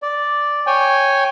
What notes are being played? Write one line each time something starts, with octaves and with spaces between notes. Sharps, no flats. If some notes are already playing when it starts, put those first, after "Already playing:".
D5
C#5 G5 G#5